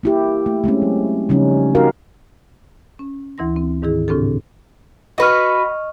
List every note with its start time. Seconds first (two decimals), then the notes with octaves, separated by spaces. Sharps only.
0.03 A#3 E4 G4
0.46 A3
0.64 G#3 A3 C4 C#4
0.82 F#3
1.29 C#3 F3 G3 A3 C#4 D#4
1.75 D#4 F#4 G4 A#4 F5
2.99 C#4
3.38 D2 E3 E4 C6 A#6
3.56 C4
3.82 G#2 D#3 E4 G#4
4.08 A2 C#3 C4 D4 G4 A4
5.18 F#4 B4 D#5 C#6 F6